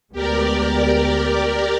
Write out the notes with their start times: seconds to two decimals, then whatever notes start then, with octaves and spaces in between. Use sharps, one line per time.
0.12 D2 G#3 B3 G4 A#4 D5